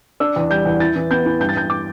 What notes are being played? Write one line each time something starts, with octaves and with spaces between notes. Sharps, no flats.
D4 E6
E2
G3 G6
E2
E4 A6
E3
B3 G6
E3
G2 G6
A6
G2 G6
D6